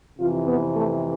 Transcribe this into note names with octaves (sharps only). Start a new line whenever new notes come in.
F2 C3 E3 F4
B3
A3